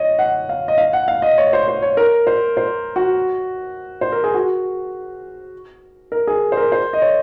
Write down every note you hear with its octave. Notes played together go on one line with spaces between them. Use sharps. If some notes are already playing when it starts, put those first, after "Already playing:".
Already playing: C#5 D#5
F#5
F5
D#5
F5
F#5
F5
D#5
C#5
C5
C5
C#5
A#4
C5
C5
F#4
C5
A#4
G#4
F#4
A#4
G#4
C5
A#4
C5
D#5
C#5